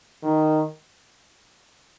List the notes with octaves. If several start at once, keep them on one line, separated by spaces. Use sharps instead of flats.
D#3